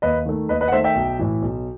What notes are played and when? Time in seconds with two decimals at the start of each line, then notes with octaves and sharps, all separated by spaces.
0.02 D#2 B4 D#5
0.26 D#3 A3
0.49 D#2 B4 D#5
0.61 B4 D#5
0.68 F#5
0.72 D#3 A3 C5 E5
0.84 E5 G5
0.95 B1
1.19 A2 E3
1.42 B1